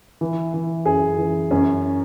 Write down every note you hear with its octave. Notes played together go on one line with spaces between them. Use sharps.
E3
E3
F#2 G#4
E3
F#2 C#4